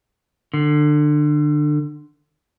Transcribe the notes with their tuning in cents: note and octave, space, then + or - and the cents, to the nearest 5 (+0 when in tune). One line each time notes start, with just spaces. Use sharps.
D3 +25